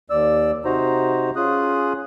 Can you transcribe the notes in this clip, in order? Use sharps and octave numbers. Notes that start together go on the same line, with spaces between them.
D#2 D5 E6
C3 D#4 F#4 C5 A#5
C#4 F4 G#4 D#6 F#6